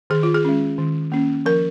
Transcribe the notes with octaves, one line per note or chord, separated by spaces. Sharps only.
D#3 G#4
F4
G#4
G#3 C#4
D#3
A#3 C#4
F3 A#4